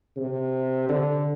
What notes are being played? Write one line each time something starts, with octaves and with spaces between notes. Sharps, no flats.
C3
D3